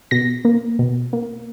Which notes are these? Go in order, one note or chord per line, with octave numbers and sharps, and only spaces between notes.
B2 A#6
A#3
B2
A#3